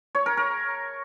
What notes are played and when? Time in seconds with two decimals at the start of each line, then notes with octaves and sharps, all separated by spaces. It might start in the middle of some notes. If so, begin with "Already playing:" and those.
0.15 C#5
0.26 A#4
0.37 A#4